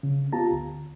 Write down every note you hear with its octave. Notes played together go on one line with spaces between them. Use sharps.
C#3
B3 F4 G4 A5 A#5
D2